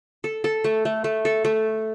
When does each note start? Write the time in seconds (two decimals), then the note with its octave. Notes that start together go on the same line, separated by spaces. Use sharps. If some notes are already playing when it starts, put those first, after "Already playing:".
0.24 A4
0.44 A4
0.64 A3
0.85 A3
1.04 A3
1.25 A4
1.45 A3